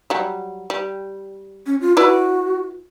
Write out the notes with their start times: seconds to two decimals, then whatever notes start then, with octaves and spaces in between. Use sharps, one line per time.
0.10 F#3 G3
0.70 G3
1.67 C#4
1.81 F4
1.97 E4 F#4 B4 D5